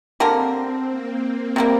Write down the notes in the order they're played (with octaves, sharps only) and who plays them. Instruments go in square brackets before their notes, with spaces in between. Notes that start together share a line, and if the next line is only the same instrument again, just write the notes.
[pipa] D3 A#3 G4 A#4 [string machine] C4
[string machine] C4
A#3
C4
[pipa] C3 G3 A#3